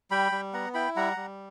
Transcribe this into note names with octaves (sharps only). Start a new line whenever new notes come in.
G3 G5 B5
G3
B3 F#5 A#5
E4 G5 B5
G3 F#5 A#5
G3